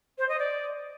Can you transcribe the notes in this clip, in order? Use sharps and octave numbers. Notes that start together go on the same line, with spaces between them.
C5
D#5
D5